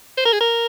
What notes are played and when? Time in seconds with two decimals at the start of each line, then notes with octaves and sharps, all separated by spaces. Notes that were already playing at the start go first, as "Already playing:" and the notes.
0.17 C5
0.25 A#4
0.32 G#4
0.41 A#4